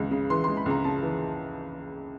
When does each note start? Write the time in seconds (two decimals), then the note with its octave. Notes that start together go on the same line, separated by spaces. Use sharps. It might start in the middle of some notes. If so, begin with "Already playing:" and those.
Already playing: C#2 E3 G#3
0.11 C#3
0.30 E3 C6
0.44 G#3 C6
0.57 B5
0.66 C#2 A#5
0.84 C#3 A5
1.03 E3